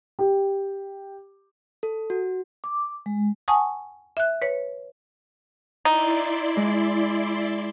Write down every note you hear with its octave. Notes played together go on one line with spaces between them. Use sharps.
G4
A4
F#4
D6
G#3
F#5 G#5 A5 C#6 D#6
E5 F#6
B4 C#5
D#4 E4 D5 C6
G#3